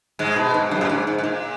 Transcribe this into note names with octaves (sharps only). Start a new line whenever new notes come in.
G#2 G#3
B2
G#2
F#2
A#2
G#2
G#2
G#2
A#2